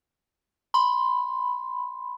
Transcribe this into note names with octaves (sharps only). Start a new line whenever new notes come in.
B5 C6